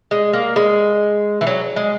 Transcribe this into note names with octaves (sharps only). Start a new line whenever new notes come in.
G#3
A#3
G#3
E3
F#3
G#3